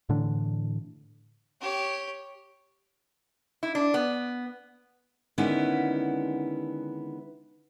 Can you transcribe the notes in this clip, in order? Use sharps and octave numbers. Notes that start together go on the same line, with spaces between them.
A2 D3 E3 D4
G4 C#5
E4
D4
B3
D3 D#3 G#3 B3 C#4 E4